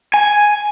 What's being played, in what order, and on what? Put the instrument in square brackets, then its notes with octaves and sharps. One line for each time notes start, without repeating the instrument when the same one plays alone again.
[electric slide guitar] G#5